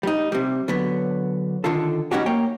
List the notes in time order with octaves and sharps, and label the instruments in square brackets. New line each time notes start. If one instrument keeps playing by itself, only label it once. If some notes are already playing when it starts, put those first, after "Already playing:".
[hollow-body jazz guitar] G3 D#4
C3 G3
D3 F#3 B3
D3 D#3 F4 A4
G3 C#4 D#4 F#4 G4
A#3 C#5 G5